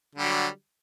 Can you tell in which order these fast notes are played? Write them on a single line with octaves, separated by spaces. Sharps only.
D3 G3 F#3